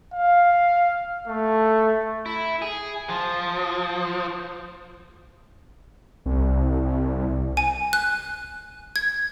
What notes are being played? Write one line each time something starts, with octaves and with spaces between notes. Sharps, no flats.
F5
A3
E4
G#4
F3
C2
G#5
F#6
G#6